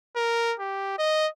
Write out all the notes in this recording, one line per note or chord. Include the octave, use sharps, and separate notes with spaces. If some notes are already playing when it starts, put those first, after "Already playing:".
A#4
G4
D#5